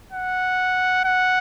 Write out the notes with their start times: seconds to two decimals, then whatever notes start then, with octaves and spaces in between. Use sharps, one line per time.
0.12 F#5
1.05 F#5